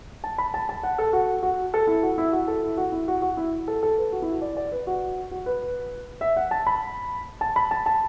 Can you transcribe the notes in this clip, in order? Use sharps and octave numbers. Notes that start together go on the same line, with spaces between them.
A5
B5
A5
A5
F#5
A4
F#4
F#4
A4
E4
F#4
E4
F#4
A4
E4
F#4
E4
F#4
F#4
E4
A4
A4
B4
F#4
E4
F#4
D5
D5
B4
F#4
F#4
B4
E5
F#5
A5
B5
A5
B5
A5
A5